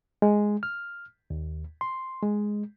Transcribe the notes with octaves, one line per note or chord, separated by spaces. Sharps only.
G#3
F6
D#2
C6
G#3